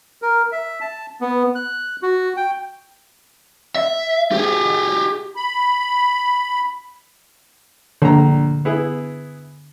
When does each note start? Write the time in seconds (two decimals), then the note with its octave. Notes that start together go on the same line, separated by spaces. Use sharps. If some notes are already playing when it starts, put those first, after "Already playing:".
0.22 A#4
0.52 E5
0.81 A5
1.21 B3
1.55 F#6
2.03 F#4
2.37 G5
3.76 E5
4.32 G4 G#4
5.36 B5
8.02 A#1 D3 A#5
8.65 B3 E4 G#4